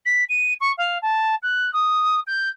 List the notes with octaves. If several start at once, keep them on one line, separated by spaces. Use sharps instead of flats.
B6
D#7
C#6
F5
A5
F#6
D#6
G6